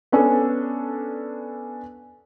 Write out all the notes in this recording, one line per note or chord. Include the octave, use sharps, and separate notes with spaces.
B3 C#4 D4 A4